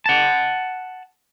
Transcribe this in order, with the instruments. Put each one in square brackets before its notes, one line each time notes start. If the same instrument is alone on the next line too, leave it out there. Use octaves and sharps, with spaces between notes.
[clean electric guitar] F#5 A5